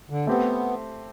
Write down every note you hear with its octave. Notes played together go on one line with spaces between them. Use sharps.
D3
A3 B3 C4 G4